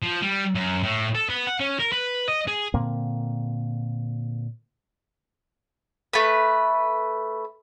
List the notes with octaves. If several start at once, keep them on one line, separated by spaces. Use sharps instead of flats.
F3
G3
F#2
A2
A4
B3
F#5
C#4
A#4
B4
D#5
G#4
A#2 D3 A#3 C4
A3 B4